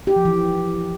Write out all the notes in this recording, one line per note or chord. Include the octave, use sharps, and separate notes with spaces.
G4
F3
E3